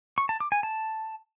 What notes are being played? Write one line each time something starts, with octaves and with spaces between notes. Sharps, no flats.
C#6
A5
D6
G#5
A5